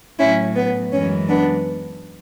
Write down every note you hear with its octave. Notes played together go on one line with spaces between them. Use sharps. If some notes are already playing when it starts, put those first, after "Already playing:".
A2 F#3 C#4 E4
B3
F#2 E3 G#3 C#4
B3 D4